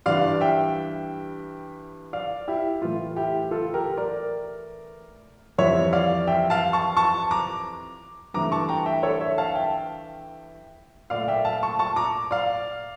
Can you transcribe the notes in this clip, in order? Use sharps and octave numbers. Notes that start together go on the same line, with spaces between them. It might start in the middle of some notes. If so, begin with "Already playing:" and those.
G2 E3 G3 D5 F5
E5 G5
D5 F5
E4 G4
A2 E3 A3 F4
E4 G4
F4 A4
G4 A#4
A#4 D5
F2 E3 G3 C#5 E5
D5 F5
E5 G5
F5 A5
A5 C#6
A5 C#6
A#5 D6
G2 E3 A3 A#5 D6
A5 C#6
G5 A#5
E5 G5
A4 C#5
C#5 E5
F5 A5
E5 G5
A#2 A3 D5 F5
E5 G5
F5 A5
A5 C#6
A5 C#6
A#5 D6
D5 F5